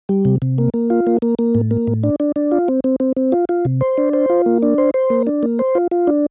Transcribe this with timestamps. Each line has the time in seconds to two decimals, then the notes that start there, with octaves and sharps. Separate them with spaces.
0.09 G3
0.25 C3
0.42 C3
0.58 A#3
0.74 A#3
0.90 F4
1.07 A#3
1.22 A#3
1.39 A#3
1.55 A2
1.71 A#3
1.87 A2
2.03 D4
2.20 D4
2.36 D4
2.52 F4
2.68 C4
2.84 C4
3.00 C4
3.17 C4
3.32 F4
3.49 F4
3.65 C3
3.81 C5
3.98 D4
4.13 C5
4.30 F4
4.46 A#3
4.62 D4
4.78 C5
4.94 C5
5.10 A#3
5.27 D4
5.43 A#3
5.59 C5
5.75 F4
5.91 F4
6.07 D4